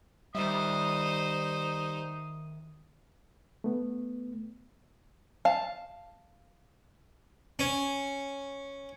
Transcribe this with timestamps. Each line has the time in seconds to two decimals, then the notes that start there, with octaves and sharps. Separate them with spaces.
0.35 D#3 G3 D#4 C5 E5 D#6
3.64 A3 B3
5.45 F5 A5
7.59 C#4